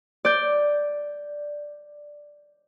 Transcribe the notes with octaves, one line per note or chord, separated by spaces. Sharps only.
D5 G6